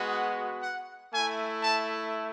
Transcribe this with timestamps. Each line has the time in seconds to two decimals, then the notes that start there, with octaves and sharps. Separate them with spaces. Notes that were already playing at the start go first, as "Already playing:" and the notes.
Already playing: G#3 B3 F#4
0.12 F#5
0.62 F#5
1.12 A3 E4 G#5
1.62 A5